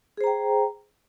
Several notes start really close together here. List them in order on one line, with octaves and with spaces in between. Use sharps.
G#4 C5 A#5 G5